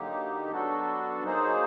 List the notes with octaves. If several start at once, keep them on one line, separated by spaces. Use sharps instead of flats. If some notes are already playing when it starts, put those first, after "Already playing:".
Already playing: D3 F#3 A#3 D#4 G4
F#3 B3 D4 F#4 A4
F#3 A#3 D#4 G#4 C5